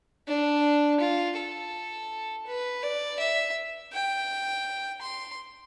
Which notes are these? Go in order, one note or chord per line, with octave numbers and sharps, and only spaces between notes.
D4
F4
A4
B4
D5
E5
G5
C6